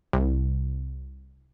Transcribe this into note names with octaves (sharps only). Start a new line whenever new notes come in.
C2